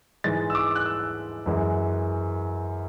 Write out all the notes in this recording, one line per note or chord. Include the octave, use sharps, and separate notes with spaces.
G#2 E3 G#3 A6
E6
D6
F#6
E6
F#2 E3 G#3